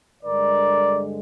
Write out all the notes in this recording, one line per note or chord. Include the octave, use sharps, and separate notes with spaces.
G2 D3 G#3 A#4 D5